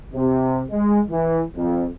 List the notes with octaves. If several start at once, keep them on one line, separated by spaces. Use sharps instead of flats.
C3
G#3
E3
F2